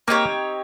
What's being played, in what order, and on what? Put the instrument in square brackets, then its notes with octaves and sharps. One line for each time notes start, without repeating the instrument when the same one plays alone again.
[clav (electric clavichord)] A#3 [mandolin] C4 D#4 G4 C#5